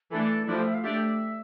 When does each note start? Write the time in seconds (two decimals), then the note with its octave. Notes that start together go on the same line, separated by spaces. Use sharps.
0.11 E3 A3 D4 A4
0.46 F3 A3 D4 E4
0.55 G4
0.65 E5
0.74 F5
0.83 A3 D4 G4 D5 E5